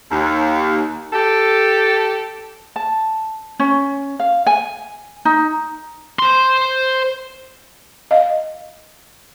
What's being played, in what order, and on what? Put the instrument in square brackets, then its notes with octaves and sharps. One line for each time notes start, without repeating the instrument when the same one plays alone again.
[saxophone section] D#2
G4 A4
[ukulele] A5
C#4
F5
G#5
D#4
[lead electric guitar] C5 C6
[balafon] D#5 F5